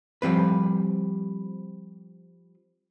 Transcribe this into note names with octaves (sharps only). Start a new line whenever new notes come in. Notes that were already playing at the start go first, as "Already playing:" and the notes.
F3 G3 C4 B4